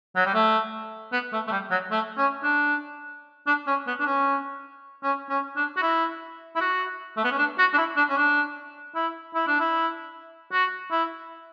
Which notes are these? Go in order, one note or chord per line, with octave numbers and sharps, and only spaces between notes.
F#3
G3
A3
B3
A3
A3
G3
F#3
A3
C#4
D4
D4
C#4
B3
D4
C#4
C#4
C#4
D4
F#4
E4
E4
F#4
A3
B3
C#4
D4
F#4
D4
E4
D4
C#4
D4
E4
E4
D4
E4
F#4
E4